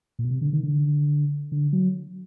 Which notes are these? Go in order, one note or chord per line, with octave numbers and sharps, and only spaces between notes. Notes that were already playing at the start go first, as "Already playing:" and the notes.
A#2
B2
C3
D3
D#3
D3
D3
F#3